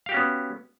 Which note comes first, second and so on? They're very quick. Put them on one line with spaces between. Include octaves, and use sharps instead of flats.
F5 G4 F#4 C#4 B3